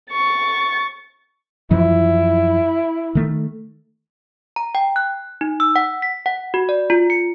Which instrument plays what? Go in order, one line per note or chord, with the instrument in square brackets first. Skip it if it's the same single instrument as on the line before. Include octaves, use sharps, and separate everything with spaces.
[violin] C#6 A6
[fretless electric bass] F#2 E3 F3 [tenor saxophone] E4
[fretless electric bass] D#3 A3
[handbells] A#5
G5
F#6
D#4
E6
F#5
B6
F#5
F#4
D5
F4
C#7